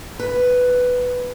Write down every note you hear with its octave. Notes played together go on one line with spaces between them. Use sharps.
B4